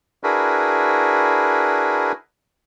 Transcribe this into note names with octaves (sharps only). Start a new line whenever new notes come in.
D4 E4 F#4 G#4 A#4 B4